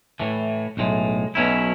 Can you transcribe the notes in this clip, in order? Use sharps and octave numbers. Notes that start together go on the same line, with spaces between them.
A2 E3 A3
B1 A2 G#3
B1 B2 F#3 C#4 E4